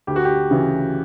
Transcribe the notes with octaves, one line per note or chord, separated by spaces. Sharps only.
D2 G4
F#4
G4
C#3 E3